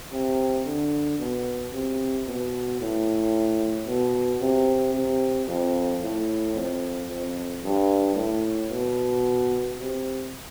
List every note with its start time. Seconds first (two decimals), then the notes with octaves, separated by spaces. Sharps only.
0.12 C3
0.66 D3
1.19 B2
1.73 C3
2.27 B2
2.80 A2
3.87 B2
4.41 C3
4.94 C3
5.47 F2
6.02 A2
6.55 F2
7.09 F2
7.63 G2
8.15 A2
8.70 B2
9.76 C3